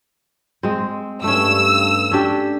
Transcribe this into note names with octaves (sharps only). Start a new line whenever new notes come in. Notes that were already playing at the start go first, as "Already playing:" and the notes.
G#3 C4
G2 A3 C#4 E6
C#4 D4 G4